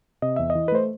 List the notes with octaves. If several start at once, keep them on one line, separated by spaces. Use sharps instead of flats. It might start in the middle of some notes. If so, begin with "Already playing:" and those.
C3 D#5
E2 E5
D#5
E3
B4
A3 C5